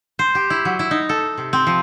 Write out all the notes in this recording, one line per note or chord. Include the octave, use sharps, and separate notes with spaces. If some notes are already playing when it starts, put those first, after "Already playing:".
C5
G4
E4
F#3
E4
D#4
A4
C3
C4
F3